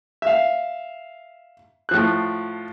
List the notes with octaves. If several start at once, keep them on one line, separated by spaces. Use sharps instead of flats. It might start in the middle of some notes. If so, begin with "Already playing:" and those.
E5 F5
A2 F3 F#6